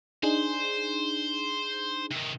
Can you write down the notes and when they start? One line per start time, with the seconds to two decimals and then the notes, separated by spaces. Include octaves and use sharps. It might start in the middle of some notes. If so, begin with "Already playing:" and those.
0.23 D4 D#4 G#4 C5
2.11 C3 D#3